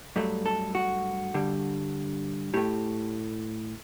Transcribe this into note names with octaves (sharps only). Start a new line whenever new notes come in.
G2 F#3 A3
A4
F#4
G2 D3 G3
A2 A3 G4